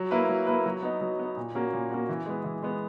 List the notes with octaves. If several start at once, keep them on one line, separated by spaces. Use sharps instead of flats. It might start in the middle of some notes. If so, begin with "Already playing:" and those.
Already playing: F#3
A#3 E4 B4
F#3
A#3 E4 B4
F#3
B3 D#4
F#3
B3 D#4
A#2
A#3 C#4 F#4
A#2
A#3 C#4 F#4
E3
G#3 B3
E3
G#3 B3